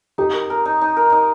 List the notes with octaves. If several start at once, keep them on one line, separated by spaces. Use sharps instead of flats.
D#4 G4
A#4
A#4
D#4
D#4
A#4
D#4